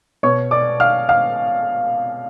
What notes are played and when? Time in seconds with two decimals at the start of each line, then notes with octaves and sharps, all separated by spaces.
0.23 B2 C#5 C#6
0.51 D5 D6
0.80 F5 F6
1.09 F5 F6